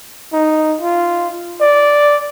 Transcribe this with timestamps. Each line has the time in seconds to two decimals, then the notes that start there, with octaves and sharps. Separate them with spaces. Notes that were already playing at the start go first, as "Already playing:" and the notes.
0.33 D#4
0.81 F4
1.61 D5